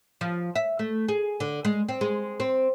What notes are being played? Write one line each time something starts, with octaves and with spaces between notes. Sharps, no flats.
F3
E5
A3
G#4
D3
G#3
C4
G#3
C4